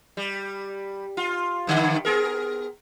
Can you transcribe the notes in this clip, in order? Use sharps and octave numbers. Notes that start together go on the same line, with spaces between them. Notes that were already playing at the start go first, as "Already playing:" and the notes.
G3
F4
G2 D3 D#3
B3 G#4 A#4